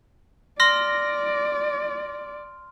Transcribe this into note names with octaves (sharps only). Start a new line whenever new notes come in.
D5 C6 F6 A#6